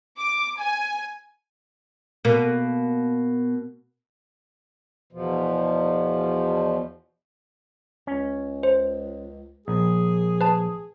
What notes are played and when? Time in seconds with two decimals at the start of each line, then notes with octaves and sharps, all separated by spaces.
0.19 D6
0.59 G#5
2.25 B2 A#3
5.13 E2 B2 F3
8.07 C#2 C#4
8.63 C5
9.68 A#1 G#4
10.41 B4 A5